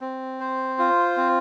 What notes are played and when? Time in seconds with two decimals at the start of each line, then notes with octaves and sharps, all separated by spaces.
0.01 C4
0.40 C5
0.79 F4
1.17 C4